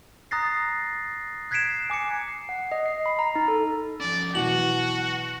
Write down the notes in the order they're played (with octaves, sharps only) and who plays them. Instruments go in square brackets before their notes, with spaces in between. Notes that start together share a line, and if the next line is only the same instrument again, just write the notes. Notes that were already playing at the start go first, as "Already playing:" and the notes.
[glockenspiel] A#5 D#6 F#6 A6 A#6 C7
F#6 G#6 B6 C7 D7 E7
G#5 D6 F#6 C#7
[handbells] C7
F#5
D#5
C7
B5
A#5
D#4
A4
[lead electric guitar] F3 C#4 [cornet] D5
[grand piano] B2 E3 F#3 [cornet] F#4 [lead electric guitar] F#5 [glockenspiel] F#7